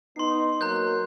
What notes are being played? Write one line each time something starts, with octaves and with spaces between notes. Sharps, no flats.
B3 D#4 C6 C7
F#3 A#3 A#4 A#5 F#6 G6